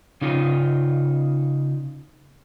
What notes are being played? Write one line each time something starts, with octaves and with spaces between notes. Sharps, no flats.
C#3 D#4 F4